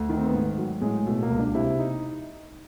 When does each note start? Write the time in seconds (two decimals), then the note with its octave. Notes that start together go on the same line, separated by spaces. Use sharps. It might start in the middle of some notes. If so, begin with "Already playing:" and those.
Already playing: D2
0.09 D#3
0.17 C4
0.26 B3
0.34 G#2
0.58 F#3
0.81 A2 G#3
1.06 B2 A3
1.23 A#3
1.30 C#2
1.39 D4
1.54 C3 E4
1.79 D#4